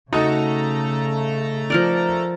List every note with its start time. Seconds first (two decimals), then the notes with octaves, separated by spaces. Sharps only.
0.13 C#3 A3 D#4 F#4 A4 A#5
1.70 F3 A#4 D5